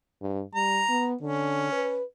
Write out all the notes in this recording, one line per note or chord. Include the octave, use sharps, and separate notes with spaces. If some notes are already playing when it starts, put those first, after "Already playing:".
G2
G3 A#5
B3
D3 C#4
B4